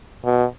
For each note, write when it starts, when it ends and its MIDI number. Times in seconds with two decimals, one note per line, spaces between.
0.25 0.45 47